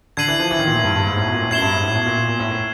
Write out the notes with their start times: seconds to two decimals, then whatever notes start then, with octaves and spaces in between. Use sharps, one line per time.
0.17 D3 G#6 C7 D#7 F#7
0.28 E3
0.40 F3
0.51 E3
0.59 D#3
0.67 A#2
0.75 A2
0.84 G2
0.95 G2
1.07 G#2
1.17 A2
1.26 B2
1.34 A#2
1.42 A2
1.51 F#2 G#6 C7 E7 G7
1.62 G2
1.73 G#2
1.84 A2
1.95 B2
2.06 A#2
2.18 A#2
2.28 A#2
2.40 A2
2.51 A2